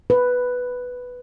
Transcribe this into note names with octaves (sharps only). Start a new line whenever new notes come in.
B4